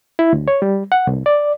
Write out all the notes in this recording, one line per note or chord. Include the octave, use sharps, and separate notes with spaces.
E4
D2
C#5
G3
F#5
C2
D5